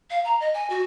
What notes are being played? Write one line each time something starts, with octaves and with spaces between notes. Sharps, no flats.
F5
A#5
D#5
G#5
F#4